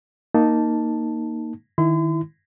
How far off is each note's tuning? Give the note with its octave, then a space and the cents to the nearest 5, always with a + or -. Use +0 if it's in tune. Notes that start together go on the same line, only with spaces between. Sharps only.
A#3 -5 D#4 +0 A5 +0
D#3 +0 E4 +0 C6 -45